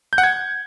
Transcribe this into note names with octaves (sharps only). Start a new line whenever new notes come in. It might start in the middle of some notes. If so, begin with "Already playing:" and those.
G6
F#5
G#6